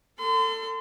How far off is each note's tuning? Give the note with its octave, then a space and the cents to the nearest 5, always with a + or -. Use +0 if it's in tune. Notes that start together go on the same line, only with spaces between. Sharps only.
A4 +30 C6 -35